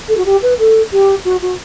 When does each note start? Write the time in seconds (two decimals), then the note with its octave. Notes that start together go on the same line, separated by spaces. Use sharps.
0.08 A4
0.17 F#4
0.25 G4
0.42 B4
0.59 A4
0.92 G4
1.24 F#4
1.42 F#4